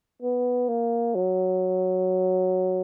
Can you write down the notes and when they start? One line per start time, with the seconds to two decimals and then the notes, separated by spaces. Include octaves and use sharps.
0.22 B3
0.68 A#3
1.15 F#3